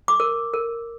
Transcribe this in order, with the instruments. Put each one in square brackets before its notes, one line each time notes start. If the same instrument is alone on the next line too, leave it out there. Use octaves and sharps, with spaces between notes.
[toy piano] D6
A#4
A#4